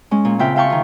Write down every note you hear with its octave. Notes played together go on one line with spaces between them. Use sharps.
G#3 C#4
A#2
C#3 C4 F4 E5 G5
E5 F5 G5 A5 C#6
D#3 F4